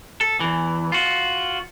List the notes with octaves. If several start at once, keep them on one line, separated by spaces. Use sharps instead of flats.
A4
E2 E3
F4 F#4